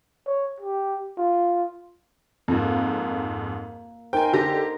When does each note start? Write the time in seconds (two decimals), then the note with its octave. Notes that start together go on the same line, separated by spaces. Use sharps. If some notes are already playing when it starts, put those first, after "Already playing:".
0.26 C#5
0.60 G4
1.18 F4
2.48 F2 G#2 A#3
4.13 D#4 A#4 C5 G5 G#5
4.33 D3 G4 A#6